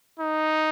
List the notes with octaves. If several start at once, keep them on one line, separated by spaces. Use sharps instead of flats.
D#4